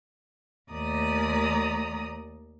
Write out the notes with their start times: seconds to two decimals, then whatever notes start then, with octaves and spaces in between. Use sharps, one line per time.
0.71 D#2 A3 D5 A#5 D#6